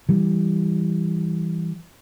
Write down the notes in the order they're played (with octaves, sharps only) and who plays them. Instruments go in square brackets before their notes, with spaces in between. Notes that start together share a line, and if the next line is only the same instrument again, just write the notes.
[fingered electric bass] E3 G3